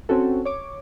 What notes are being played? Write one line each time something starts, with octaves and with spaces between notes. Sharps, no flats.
C4 C#4 F#4 A4
C#5 D6